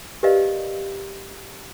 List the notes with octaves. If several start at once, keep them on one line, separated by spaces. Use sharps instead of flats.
G4 A#4 B4 D5 D#5 F5